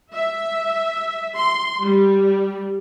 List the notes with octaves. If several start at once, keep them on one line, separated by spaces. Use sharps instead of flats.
E5
C6
G3